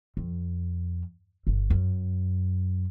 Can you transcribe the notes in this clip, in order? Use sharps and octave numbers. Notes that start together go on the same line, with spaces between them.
F2
G1
F#2